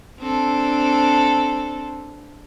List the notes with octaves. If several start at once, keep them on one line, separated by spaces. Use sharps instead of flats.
C4 D4 A4